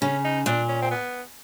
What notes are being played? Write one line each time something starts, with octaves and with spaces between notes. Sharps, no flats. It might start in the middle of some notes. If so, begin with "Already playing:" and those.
C#3 C#4
D#4
A#2 D4
C#4
C4
B3